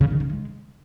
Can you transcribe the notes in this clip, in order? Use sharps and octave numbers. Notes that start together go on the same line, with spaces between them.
C#3
D#3
C#3
G#3